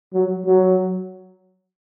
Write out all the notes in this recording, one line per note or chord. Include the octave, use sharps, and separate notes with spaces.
F#3
F#3